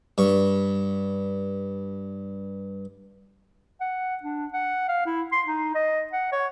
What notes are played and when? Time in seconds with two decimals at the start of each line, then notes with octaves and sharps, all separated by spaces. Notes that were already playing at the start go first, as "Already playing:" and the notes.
0.18 G2 C#6
3.81 F#5
4.23 D4
4.53 F#5
4.89 F5
5.06 E4
5.32 C6
5.47 D#4
5.75 D#5
6.13 F#5
6.32 C#5